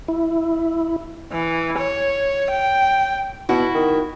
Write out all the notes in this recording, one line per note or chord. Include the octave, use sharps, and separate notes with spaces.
E4
E3
C#5
G5
B2 E4 F#4
D#3